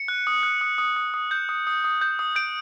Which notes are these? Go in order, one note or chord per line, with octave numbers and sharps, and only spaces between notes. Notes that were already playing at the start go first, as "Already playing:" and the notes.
Already playing: C#7
F#6
D#6
F#6
D#6
D#6
D#6
D#6
G6
D#6
D#6
D#6
G6
D#6
G6 D7